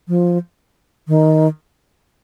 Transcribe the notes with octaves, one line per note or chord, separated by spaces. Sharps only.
F3
D#3